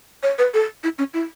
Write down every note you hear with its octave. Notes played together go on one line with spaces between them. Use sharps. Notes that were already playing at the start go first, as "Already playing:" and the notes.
C#5
B4
A4
E4
C#4
E4